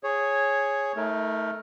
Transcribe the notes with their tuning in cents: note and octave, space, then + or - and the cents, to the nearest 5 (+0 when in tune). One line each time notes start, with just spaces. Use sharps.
G#4 +0 C#5 -5
A3 +0 D#4 +40 A#4 +5